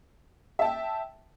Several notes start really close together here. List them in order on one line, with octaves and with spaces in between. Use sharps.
E5 A5 G5